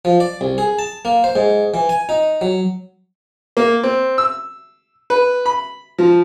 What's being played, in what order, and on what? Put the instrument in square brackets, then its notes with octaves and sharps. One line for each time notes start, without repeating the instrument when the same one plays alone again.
[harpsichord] F3
D5
C2
G#4
A5
A#3
C5
G#2
E3
G#5
D#4
F#3
[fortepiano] A#3
C4
E6
B4
B5
F3